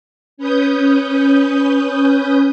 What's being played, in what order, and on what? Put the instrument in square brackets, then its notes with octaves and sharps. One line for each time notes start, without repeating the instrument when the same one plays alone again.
[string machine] C#4 B4 D#6 G6